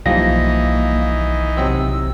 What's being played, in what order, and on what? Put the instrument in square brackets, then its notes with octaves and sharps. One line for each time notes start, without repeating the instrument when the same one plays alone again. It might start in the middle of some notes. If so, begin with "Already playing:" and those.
[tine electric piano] B1 A#6 [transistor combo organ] E3 D#4 [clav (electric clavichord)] F3 G3 [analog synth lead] A#3
[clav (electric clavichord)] C3 F#3 C4 [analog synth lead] E6